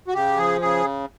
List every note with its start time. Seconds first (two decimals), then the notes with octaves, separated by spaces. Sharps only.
0.08 F#4
0.14 C#3 G4
0.37 F3 G#4
0.61 C#3 G#4